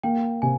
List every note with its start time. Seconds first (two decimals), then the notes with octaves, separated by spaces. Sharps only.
0.03 A#3 G5
0.42 C3 G#5